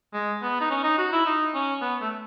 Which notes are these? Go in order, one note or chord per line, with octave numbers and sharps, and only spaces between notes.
G#3
B3
D#4
C#4
D#4
F#4
E4
D#4
C#4
B3
A3